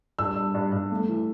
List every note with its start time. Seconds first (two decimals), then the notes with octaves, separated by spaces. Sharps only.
0.19 G2 E6
0.36 G2
0.54 G2
0.72 G2
0.91 A3
1.09 E3